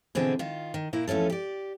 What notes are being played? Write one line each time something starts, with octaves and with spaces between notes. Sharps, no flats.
B2 D3 E3 C4 G#4
D#3 F4
D#3
A#2 A#3 E4
E2 F3 A3 C#4 A4
G4 D5